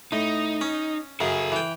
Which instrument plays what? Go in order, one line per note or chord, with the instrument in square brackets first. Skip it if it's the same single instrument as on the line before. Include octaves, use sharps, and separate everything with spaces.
[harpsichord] A2 [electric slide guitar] D#4
[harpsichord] C#4
[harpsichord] F#2 C#3 [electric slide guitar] A4 G#5
[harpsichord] E3 G5